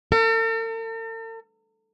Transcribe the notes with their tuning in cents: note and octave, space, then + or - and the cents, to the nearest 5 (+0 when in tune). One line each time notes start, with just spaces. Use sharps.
A4 +45